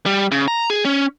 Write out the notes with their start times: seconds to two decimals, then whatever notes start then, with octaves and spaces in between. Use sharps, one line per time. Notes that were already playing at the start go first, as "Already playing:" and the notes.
0.06 G3
0.32 C#3
0.48 A#5
0.70 G#4
0.85 C#4